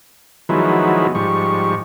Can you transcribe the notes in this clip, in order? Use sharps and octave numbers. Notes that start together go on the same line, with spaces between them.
D#3 F3 F#3 G#3 B3 E4
G#2 F3 G3 C#6